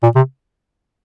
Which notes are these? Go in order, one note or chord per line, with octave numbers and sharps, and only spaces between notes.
A#2
C3